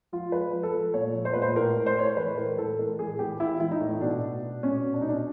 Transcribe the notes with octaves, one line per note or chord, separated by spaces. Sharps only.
F3 F4
F3 B4
F3
A4
F3
A#2 C#5
F3
C5
A#2 B4
C5
A2 A#4
A2
C5
A2 C#5
C5
E3 B4
A2 A#4
A#4
E3 A4
A2 A#4
E3 G#4
E3 G4
E3 E4
E3 E4
D#4
A2
B2 D4
B2
B2
B2 C#4
B2
D4
D#4
B2 D4